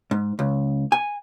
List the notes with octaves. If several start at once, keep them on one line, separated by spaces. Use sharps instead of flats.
G#2
C#2
G#5